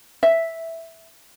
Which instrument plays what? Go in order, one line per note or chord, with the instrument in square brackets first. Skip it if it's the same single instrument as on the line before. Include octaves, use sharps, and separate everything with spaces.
[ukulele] E5